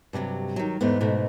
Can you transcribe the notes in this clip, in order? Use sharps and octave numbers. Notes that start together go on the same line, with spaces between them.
G2 C3 D#3 F#3
D#3 F#3
E2 G#2 A3 B3
G#2 B2 A3